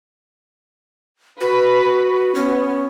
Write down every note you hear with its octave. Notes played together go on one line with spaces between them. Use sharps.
F#4 B4
B3 C#4